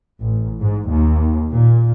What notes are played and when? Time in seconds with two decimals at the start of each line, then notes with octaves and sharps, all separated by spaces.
0.21 A1
0.61 G#2
0.90 D#2
1.51 A#2